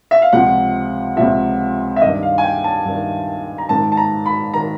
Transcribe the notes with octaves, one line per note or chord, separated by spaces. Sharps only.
E5
F5
C#2 C3 F3 F#5
C#2 C3 F3 E5
E5
G2 D#3 D#5
F5
G#5
G5
A5
G2 D#3
A#5
G#2 D#3 A5
A5
A#5
B5
D#3 A#5